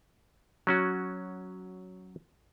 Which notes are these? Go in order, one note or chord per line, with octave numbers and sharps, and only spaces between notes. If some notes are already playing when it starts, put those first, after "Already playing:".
F#3 C#4 F#4